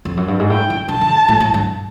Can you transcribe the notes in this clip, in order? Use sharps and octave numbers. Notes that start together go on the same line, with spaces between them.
F2
F#2
G2
G#2
A2 G5
D3
D3 A5
D#3
D3
A2
A2
G2